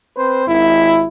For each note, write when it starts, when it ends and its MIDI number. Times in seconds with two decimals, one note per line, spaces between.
0.17 0.47 60
0.17 0.47 71
0.17 0.47 72
0.47 1.07 32
0.47 1.07 64